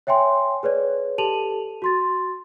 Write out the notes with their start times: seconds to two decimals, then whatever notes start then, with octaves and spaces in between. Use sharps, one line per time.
0.07 C#5 E5 G5 G#5 C6
0.63 G#4 B4 C#5 D5
1.18 G4 A4 A5 D#7 F7 F#7
1.82 F#4 C6 A6